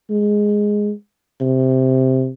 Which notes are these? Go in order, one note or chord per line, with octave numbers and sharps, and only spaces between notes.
G#3
C3